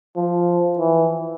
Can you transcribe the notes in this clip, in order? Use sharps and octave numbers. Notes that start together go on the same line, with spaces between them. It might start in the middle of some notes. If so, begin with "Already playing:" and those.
F3
E3